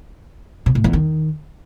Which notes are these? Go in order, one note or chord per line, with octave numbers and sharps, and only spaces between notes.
B2
A2
E2
D#3